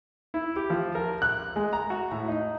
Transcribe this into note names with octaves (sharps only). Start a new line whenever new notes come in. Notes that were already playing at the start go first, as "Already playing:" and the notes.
E4
G4
F3
A#4
F#6
G#3
A#5
F#4
A2
D#4